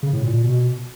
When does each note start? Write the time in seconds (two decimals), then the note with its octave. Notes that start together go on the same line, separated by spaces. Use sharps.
0.03 C#3
0.13 A2
0.23 A#2
0.33 A#2
0.44 B2